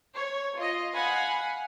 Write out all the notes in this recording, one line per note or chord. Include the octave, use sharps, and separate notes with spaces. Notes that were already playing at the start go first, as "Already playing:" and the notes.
C#5
F4 D#5
F5 F#5 G#5 B5